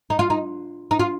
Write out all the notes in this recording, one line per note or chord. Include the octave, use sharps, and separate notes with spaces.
D#4
F4
D#4
D#4
F4